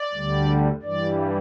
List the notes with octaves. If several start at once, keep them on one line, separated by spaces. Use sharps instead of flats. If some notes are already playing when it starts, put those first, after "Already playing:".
Already playing: D5
D2 D3 G3
G2 E3 G3 D5